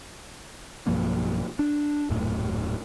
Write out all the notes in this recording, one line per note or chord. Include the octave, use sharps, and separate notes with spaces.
B1 G2 F3 A#3
D4
D#1 F#2 A2